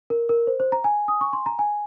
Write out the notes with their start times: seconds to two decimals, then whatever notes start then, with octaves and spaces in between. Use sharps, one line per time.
0.10 A#4
0.29 A#4
0.47 C5
0.60 C5
0.72 A#5
0.84 G#5
1.08 D#6
1.21 C#6
1.33 C6
1.46 A#5
1.59 G#5